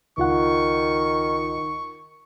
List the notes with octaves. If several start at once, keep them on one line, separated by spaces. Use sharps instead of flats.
C#2 D#3 F4 F#5 C#6